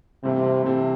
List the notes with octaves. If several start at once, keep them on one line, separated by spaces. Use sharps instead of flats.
G2 C3 E3 A3 C4
G2 C3 E3 A3 C4